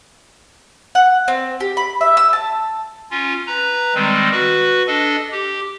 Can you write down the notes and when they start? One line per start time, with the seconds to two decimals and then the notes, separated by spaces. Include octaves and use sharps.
0.95 F#5
1.28 C4
1.60 G4
1.77 B5
2.01 E5
2.17 E6
2.33 A5
3.11 C#4 F4
3.47 B4 A#5
3.95 D#3 G3 G#3 C4
4.31 F#4 B4
4.87 D4 A4 D#5
5.32 G4